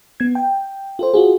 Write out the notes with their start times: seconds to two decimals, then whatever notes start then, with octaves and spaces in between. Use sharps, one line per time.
0.20 B3 G#6
0.35 G5
0.99 F4 A4 C5
1.14 F4 F#4 G#4